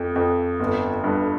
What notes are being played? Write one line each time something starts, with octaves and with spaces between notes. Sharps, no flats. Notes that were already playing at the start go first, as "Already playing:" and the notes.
Already playing: F2
F2
G1
G2